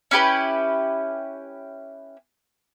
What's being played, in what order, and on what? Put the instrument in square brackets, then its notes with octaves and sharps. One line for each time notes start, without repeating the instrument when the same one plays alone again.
[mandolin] C#4 E4 G4 B4